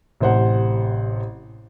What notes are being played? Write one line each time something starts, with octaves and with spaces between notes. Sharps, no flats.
A1 C3 C5 F#5